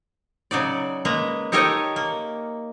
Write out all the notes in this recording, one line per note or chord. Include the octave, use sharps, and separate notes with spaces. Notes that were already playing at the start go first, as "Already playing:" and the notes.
C#3 F#3 D#4 D5
G#3 A#3 B4 A#5
D#4 G4 A4 A#4 C#5 D#5
A#3